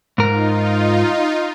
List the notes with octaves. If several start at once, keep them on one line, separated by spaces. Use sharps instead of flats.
G#2 D#4 F4 A#4